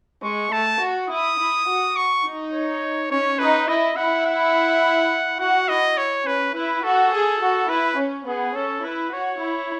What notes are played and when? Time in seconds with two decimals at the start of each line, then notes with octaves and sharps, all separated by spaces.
0.23 G#3 C#6
0.52 A3 A5
0.81 F#4
1.10 E4 D#6
1.39 E4
1.68 F#4
1.96 C#6
2.25 D#4
2.53 C#5
3.10 C#4 C#5
3.39 D#4 B4
3.68 E4 D#5
3.96 E4 F#5
4.26 F#5
5.40 F#4 F#5
5.68 E4 D#5
5.97 C#5
6.26 C#4 B4
6.55 E4 B4
6.84 F#4 A4
7.13 G#4
7.42 F#4
7.69 E4 B4
7.98 C#4
8.28 B3 G#4
8.56 C#4 A4
8.84 E4 B4
9.13 F#4 C#5
9.41 E4